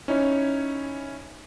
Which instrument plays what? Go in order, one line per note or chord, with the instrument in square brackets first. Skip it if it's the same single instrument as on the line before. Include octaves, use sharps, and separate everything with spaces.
[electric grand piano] C#4 D#4 E4 C#5